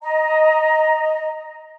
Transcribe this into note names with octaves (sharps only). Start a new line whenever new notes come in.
D#5 A#5